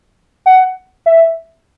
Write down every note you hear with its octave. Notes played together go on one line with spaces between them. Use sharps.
F#5
E5